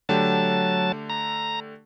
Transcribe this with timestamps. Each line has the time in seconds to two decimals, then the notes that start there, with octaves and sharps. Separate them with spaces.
0.09 D3 F#3 A3 G4 A5
1.10 A#5